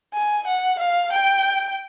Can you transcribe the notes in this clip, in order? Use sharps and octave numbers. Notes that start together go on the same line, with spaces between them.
G#5
F#5
F5
G5